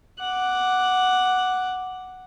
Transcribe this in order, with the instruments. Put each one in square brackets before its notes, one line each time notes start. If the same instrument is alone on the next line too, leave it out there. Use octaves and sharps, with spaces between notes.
[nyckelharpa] F#5 D6